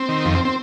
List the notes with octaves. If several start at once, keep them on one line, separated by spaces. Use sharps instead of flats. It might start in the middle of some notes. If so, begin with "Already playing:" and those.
Already playing: C4
D#3
F2
C4
C4